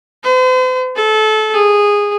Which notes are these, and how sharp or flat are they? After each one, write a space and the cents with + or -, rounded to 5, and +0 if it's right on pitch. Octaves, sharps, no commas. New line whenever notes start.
C5 -45
A4 -25
G#4 -15